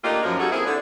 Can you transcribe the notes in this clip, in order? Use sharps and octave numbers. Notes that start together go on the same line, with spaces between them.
A3 A#3 D4 D#4 F4 G4
F#2 F3 A#4
G3 D#4 F#4 G#4 A4
A#3 C4 E4 G#4
D3